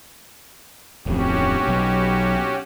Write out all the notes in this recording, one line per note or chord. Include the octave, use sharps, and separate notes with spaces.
D1 F2 C#4 F#4 G4
B1